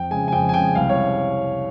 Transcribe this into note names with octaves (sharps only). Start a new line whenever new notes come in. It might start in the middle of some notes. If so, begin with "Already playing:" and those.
Already playing: F2 G5
C#3 G#3 G#5
G#5
F2 G5
G#5
C#3 G#3 G5
C2 F5
C#5